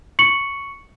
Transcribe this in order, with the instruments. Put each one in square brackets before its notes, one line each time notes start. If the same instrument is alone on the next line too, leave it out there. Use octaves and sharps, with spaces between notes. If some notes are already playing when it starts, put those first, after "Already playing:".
[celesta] C#6 C#7 F#7